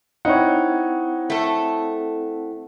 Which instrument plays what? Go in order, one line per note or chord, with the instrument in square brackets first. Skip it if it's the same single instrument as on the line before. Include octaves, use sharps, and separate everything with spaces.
[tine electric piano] C4 E4 F#5 [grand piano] D#4 C#5
[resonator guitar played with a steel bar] A3 A4